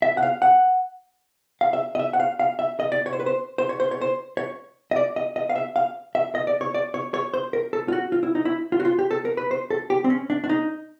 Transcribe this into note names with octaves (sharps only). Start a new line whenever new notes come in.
E5
F#5
F5
F#5
F5
E5
D#5
E5
F#5
F5
F5
E5
D#5
D5
C#5
C5
B4
C5
C5
C#5
C5
C#5
C5
C#5
D#5
D5
D#5
D#5
F5
E5
F5
E5
D#5
D5
C#5
D5
C#5
C#5
C5
A#4
A4
F4
F#4
F4
E4
D#4
E4
F4
F#4
F4
G4
A4
A#4
B4
C5
A4
G4
C4
C#4
D4
D4
D#4